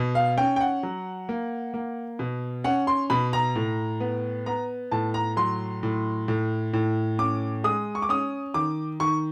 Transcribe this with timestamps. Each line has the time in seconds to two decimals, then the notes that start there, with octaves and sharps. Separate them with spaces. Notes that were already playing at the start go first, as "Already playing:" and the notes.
Already playing: B2
0.15 F5
0.37 C#4 G5
0.56 G5
0.61 F#5
0.83 F#3
1.29 A#3
1.74 A#3
2.19 B2
2.64 C#4 F#5
2.87 C6
3.10 B2 B5
3.33 A#5
3.55 A2
4.00 B3
4.46 B3 A#5
4.91 A2 A5
5.14 A#5
5.37 F#3 C6
5.83 A2
6.28 A2
6.73 A2
7.19 C#4 D6
7.64 G#3 D#6
7.95 C#6
8.02 D6
8.09 C#4 D#6
8.54 D#3 D6
9.00 D#3 C#6